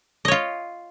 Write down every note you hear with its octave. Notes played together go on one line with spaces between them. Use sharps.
F4 C#5 D#5